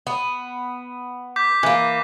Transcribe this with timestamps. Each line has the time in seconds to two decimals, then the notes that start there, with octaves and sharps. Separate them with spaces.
0.07 B3
1.36 D6 G6 B6
1.63 E3 A#3